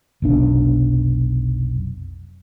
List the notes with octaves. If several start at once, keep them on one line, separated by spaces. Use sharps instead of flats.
F1 B1 D4